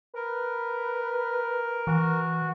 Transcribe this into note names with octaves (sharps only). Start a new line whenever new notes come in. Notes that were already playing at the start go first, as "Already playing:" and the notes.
A#4 B4
E3 F#4